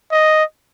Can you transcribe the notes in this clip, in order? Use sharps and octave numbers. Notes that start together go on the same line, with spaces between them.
D#5